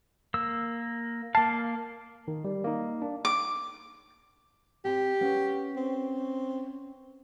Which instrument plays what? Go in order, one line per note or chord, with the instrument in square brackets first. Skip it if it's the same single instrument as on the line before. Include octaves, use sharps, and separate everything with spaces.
[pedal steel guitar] A#3 E6
[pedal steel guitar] A#3 F5 [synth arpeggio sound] A5
[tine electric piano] D#3
G3
A#3 D#4
D4
[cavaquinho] D6
[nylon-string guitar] C4 G#5 [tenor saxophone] G4
[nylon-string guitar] B3 C#4
[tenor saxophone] C4